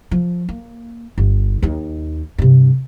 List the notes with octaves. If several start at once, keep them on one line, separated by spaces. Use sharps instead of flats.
F3
A#3
G1
D#2 D#4
G2 C3